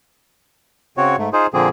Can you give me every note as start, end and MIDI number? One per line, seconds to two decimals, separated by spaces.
0.97 1.16 49
0.97 1.16 60
0.97 1.16 66
0.97 1.16 73
1.18 1.29 44
1.18 1.29 57
1.33 1.47 63
1.33 1.47 65
1.33 1.47 68
1.33 1.47 72
1.54 1.69 46
1.54 1.69 50
1.54 1.69 53
1.54 1.69 58
1.54 1.69 60
1.54 1.69 68